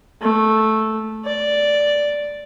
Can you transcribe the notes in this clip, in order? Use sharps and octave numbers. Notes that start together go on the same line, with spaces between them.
A3
D5